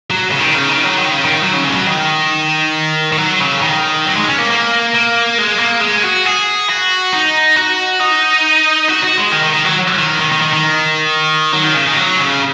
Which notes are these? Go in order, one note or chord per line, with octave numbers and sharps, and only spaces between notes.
F#3
C#3
D#3
C#3
D#3
F#3
D#3
C#3
D#3
F#3
C#3
C#3
G#3
F#3
D#3
D#3
F#3
C#3
D#3
F#3
G#3
C#4
A#3
A#3
A#3
G#3
A#3
G#3
F#4
G#4
F#4
D#4
F#4
D#4
F#4
F#4
G#3
D#3
D#3
D#3
F#3
D#3
D#3
D#3
D#3
D#3
F#3
D#3
C#3
D#3
F#3
C#3